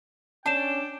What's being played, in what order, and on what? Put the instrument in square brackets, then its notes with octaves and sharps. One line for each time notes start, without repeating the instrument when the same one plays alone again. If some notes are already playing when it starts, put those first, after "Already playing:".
[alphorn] C#4 [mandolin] D4 [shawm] G5 [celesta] A5 E7